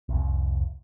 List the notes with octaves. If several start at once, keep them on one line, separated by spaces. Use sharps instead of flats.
F1 C2